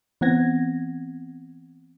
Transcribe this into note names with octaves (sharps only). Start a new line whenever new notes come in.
E3 B3 C4 F#5 G#6 A#6